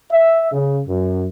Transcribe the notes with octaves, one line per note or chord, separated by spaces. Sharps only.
E5
C#3
F#2